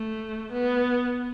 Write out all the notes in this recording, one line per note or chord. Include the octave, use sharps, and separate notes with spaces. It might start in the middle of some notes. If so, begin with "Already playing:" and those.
Already playing: A3
B3